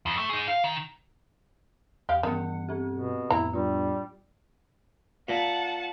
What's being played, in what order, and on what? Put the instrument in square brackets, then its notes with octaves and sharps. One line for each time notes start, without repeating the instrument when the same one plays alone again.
[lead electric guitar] F2
A3
D#4 G#4
F5
D#3
[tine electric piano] E2 [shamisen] G4 F5
[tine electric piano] G2 G3 F#5 [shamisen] D#3 [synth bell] E3 B3 C#7
[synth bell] C4 G4
[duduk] B2
[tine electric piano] F2 A2 B3 [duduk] E4 [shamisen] A#5
[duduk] G3 [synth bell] D4 F4
[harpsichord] A#2 [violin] F#5 A5